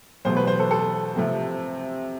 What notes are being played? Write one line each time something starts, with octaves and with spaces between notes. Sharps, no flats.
E2 B2 F#3 A3 C5
B4
C5
A4
A4
C3 F3 A3 C4